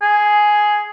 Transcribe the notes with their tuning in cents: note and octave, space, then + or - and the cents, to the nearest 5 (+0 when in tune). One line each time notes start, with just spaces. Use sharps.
G#4 +5